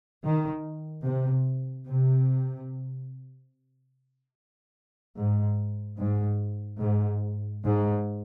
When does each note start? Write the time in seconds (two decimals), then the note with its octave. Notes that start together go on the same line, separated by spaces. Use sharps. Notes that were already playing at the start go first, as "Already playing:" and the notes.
0.22 D#3
1.03 C3
1.86 C3
5.17 G#2
5.98 G#2
6.81 G#2
7.63 G#2